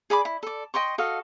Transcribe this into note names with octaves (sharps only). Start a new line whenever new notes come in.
G#4 D5 B5 D6
E4
A4 D5
D#5 G5 C6 C#6
F#4 A4 D#5 F5